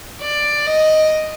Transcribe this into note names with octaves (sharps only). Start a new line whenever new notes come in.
D5
D#5